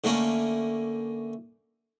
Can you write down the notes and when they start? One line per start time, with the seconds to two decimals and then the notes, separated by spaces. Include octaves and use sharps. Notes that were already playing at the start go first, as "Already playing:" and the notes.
0.04 D3 A3 A#3 C#4